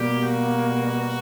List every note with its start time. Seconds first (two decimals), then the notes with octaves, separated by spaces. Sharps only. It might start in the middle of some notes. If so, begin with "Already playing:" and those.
Already playing: B2 G3 A#3 G4
0.25 F#4